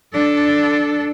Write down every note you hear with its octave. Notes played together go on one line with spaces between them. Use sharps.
D4 A4